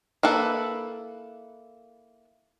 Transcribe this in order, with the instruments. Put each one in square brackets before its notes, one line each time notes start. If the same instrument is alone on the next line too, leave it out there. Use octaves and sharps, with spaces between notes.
[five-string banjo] A#3 E4 A4 B4